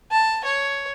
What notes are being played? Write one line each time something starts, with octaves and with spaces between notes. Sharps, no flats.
A5
C#5